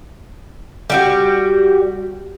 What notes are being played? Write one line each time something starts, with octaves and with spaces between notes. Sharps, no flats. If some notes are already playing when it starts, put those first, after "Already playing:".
G3 F#4 G4